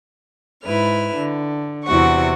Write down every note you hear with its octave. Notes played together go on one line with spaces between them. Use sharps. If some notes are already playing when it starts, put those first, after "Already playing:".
G#2 E4 B4 F6
D3
E2 C3 E4 F#4 F#5 C#6